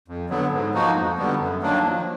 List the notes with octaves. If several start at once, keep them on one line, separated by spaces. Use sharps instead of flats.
F2
D3 F#3 B3
G#2
F3 A#3 D#4 F#4
F2
D3 G3 B3
F#2
D#3 F#3 A#3 D4
F3